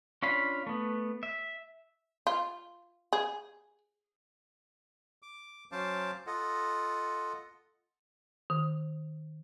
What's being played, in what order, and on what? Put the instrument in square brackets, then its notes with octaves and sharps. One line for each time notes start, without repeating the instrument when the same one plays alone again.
[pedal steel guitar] C#4 D4 F4 F5 B5
A3 B3
E5
[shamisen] F4
G#4
[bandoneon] D6
F#3 C#4 C5 F5 A5 D6
F4 A4 D#5 F#5
[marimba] D#3